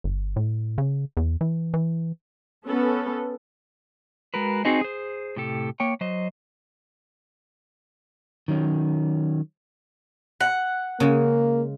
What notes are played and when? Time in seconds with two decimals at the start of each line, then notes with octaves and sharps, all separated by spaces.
0.04 G1
0.36 A2
0.78 C#3
1.17 E2
1.41 E3
1.74 E3
2.65 B3 C#4 A4 B4
4.34 G#3 F#4 A#4 B4
4.65 C4 D#4 F#4 G#4 C5 D#5
4.81 G#4 C5
5.36 A2 C3 G4 A4
5.80 A#3 C#5 G5
6.01 F#3 C5 D#5
8.48 D#3 F#3 C#4
10.41 F#5
11.00 C#3 G#3 A#3